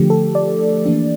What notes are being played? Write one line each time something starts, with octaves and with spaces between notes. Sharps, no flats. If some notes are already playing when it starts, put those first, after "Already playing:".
Already playing: D3 F3 A3 G4
A4
D5
E3 A#3 D4